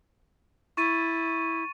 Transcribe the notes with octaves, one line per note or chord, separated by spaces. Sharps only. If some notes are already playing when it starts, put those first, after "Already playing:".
E4 C#6 A6 D#7